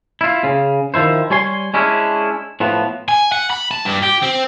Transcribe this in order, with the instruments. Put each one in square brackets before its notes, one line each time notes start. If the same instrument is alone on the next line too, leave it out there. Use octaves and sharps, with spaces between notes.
[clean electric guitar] E4 F4
C#3
D#3 F3 E4 C5
G3 C#5 G#5 C6
G#3 C#4 D4 E4
A2 F3 B3
[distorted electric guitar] G#5
F#5
B5
A5
G2
G4
C4